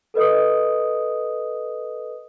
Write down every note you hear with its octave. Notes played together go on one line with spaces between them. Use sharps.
A4 B4 D#5 D#6